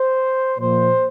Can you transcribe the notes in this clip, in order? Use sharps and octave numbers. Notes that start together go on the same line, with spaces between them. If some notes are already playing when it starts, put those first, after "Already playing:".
Already playing: C5
A#2 F3 C5